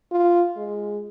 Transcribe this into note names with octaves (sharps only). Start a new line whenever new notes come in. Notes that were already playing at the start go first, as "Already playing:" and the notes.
F4
G#3